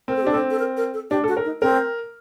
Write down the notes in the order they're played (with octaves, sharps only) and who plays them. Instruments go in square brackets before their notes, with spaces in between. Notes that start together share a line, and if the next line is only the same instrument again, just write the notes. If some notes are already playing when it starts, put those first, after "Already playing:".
[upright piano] C4 [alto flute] A#4
[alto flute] A4
G4
[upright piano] D4
[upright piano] C4 [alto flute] A4
[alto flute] A4
A#4
A#4
A4
[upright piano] D4 [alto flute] G4
[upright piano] A4
[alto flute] F#4
[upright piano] A#4
[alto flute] D#4
[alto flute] C4 [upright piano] A#4